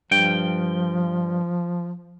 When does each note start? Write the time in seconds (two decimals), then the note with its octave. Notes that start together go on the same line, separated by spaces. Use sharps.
0.11 G2 F3 G5